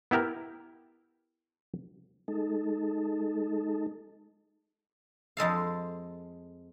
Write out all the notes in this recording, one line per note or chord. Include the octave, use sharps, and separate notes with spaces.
B3 E4 G4 A#4
G#3 D#4 A4
F2 G#3 A4 F5